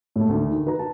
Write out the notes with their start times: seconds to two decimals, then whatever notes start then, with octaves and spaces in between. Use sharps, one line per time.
0.16 A2 A3
0.29 D2 D#3
0.51 D#3
0.67 B4 A#5
0.79 A5